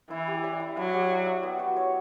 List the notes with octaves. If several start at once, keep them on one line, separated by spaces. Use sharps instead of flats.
E3 E4
G4
D5
E4
F#3 E4
G4
D5
E4
B3
F#4
C#5